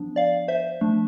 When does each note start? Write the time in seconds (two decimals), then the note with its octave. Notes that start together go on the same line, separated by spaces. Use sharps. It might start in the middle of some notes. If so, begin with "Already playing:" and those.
Already playing: F3 B3 D4
0.16 D5 F5
0.48 C5 E5
0.81 F3 A3 D4